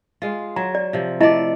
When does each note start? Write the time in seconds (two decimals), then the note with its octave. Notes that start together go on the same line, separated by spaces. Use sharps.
0.22 G#3 F4
0.56 F#3 A#5
0.75 D5
0.93 C3 F3
1.21 A3 E4 D5 D#5